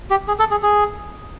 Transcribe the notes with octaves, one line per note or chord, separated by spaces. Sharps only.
G4
G#4
A4
G#4
G#4